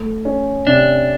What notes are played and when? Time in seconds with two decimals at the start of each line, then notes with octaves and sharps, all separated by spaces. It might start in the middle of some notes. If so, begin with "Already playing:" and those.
Already playing: A3
0.25 C#4
0.66 C3 D4